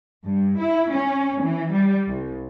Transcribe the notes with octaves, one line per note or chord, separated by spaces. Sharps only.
G2
E4
C#4
E3
G3
C2